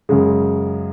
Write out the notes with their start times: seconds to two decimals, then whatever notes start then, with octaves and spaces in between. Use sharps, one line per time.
0.09 F#2 C#3 G#3